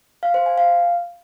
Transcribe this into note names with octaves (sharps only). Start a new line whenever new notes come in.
F5
C5
G#5
F5